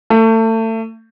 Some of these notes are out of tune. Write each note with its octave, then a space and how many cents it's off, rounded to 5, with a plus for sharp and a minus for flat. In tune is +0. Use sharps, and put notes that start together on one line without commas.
A3 +30